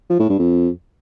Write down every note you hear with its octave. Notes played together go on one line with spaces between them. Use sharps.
F3
A2
G2
F2